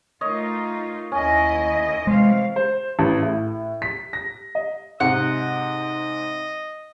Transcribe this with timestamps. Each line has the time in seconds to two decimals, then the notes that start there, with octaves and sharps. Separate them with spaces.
0.21 A3 D#4 F4 A#4 C#5 D#5
1.12 D#2 C#4 E4 D#5
2.07 C3 E3 G#3 C5 F5
2.56 C5
2.99 A1
3.22 A2
3.82 B6
4.13 A#6
4.55 D#5
5.00 G#2 C3 D#5 F#5